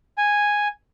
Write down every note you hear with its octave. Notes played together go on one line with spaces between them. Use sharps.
G#5